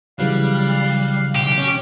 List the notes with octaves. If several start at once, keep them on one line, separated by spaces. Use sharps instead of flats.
C#3 E3 F#3 G3 F5 F#6
B1 G4
C#4